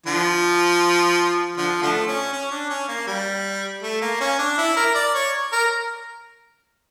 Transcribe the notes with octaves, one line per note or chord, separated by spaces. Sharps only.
D3 F3
D3 F3
D3 F3 A3
C#4
C#4
D4
C#4
A#3
G3
A3
A#3
C#4
D4
E4
A#4
D5
C#5
A#4